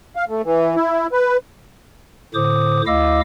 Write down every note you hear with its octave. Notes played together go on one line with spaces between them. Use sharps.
F5
A3
E3
E4
B4
A2 D3 C5 D6 D#6
D2 E4 D#5 F5 D6 E6